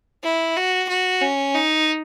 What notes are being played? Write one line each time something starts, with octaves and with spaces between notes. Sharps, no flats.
E4
F#4
F#4
C#4
D#4